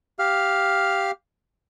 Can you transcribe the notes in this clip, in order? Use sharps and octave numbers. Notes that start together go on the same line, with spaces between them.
G4 F5 F6